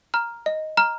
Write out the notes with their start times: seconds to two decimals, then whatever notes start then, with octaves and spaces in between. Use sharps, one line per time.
0.14 A#5 F6
0.46 D#5
0.77 A#5 F6